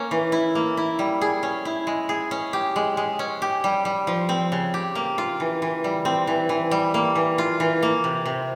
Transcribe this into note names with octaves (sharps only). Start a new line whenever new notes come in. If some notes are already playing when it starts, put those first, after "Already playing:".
Already playing: A#3 C#4
E3
E4
A#3
E4
G3
G#4
C#4
E4
G#3
G#4
C#4
G4
G#3
G#3
C#4
G4
G3
G3
F3
C4
C#3
G4
A#3
F4
E3
E3
G3
C4
E3
E3
G3
A#3
E3
F4
E3
A#3
C3
C3